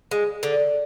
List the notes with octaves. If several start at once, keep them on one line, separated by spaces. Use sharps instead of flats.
G#3
D3